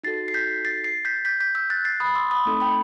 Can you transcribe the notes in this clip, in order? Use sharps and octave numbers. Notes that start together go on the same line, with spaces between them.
D#4 F#4 A4 A6 C7
C7
G6 B6
A6 C7
A6 C7
G6 B6
G6 B6
G6 B6
E6 G6
F#6 A6
A6 C7
B5 D#6
C6 E6
B5 D#6
A3 C4 D#4 A4
G5 B5